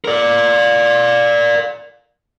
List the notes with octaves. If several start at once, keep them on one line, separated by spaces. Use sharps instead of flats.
A#4 D5